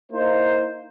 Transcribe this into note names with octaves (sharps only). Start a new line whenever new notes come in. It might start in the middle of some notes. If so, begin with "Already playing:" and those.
A#3 D#4 E4 C5